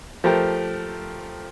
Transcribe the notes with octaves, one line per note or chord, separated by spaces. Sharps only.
F3 A3 G4 A#4